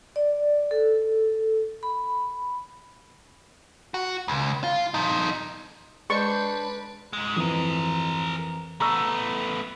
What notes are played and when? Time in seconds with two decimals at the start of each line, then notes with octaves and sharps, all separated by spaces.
0.16 D5
0.71 A4
1.83 B5
3.94 F#4
4.28 C#2
4.64 F4
4.94 F3 D#4
6.10 G#3 D4 B4 C5 C#6
7.13 G#2 G#3
7.36 F2 E3 G#4 A#4
8.80 A3 B3 A#5 C#6 E6